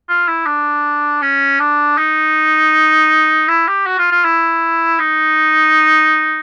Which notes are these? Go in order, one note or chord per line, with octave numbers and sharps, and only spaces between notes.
F4
E4
D4
C#4
D4
D#4
E4
G4
F#4
F4
F4
E4
D#4